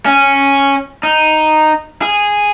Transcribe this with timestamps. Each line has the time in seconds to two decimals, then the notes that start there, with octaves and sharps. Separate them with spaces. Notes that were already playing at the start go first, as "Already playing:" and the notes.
0.06 C#4
1.03 D#4
2.02 G#4